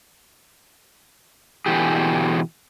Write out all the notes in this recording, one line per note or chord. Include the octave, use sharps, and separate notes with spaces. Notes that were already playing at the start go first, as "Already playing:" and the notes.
B2 D3 E3 G4 G#4